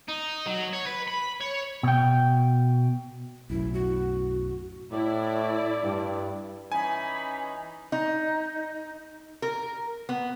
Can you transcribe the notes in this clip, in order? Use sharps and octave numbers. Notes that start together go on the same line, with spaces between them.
D#4
F#3
C#5
B4
B5
C#5
B2 G5
B1 F#2 A2 E4
F#4
A2 E4 D5
G2
E3 C#4 D#4 G#5 B5
D#4
A#4
B3